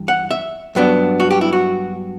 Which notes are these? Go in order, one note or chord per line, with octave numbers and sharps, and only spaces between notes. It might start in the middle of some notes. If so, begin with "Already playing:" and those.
Already playing: G2 E3
F#5
E5
G2 F#3 B3 D4
F#4
G4
E4
F#4